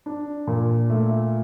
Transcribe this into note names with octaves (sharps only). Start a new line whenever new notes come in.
D4
A#2
A3